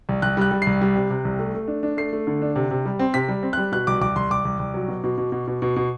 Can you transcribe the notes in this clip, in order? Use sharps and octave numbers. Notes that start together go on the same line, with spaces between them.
C2
C2 F#6
G3 F#6
G3
C2 C7
G3
C3
C3
C2
A3
A3
D4
D4
A3 C7
A3
D3
D4
C3
C3
G3
C4
C3 B6
G3
C4
G3 F#6
B2 F#6
C2 D6
C2 D6
C2 C6
C2 D6
C2
C2
F#3
B2
B2
B2
B2
B2
B2
B2